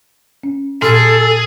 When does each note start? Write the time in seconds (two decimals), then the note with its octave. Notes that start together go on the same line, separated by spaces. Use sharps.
0.43 C#4
0.82 A#2 G#4 A4 C6 F6